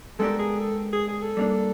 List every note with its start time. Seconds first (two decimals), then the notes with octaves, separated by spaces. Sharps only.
0.19 G#3 B3 D4 G4 A4 A#4
0.39 G#4
0.59 A4
0.93 G#4
1.08 G#4
1.22 A4
1.37 G3 A#3 D4